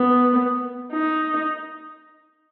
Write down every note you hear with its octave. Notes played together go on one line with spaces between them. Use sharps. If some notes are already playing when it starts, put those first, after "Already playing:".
Already playing: B3
D#4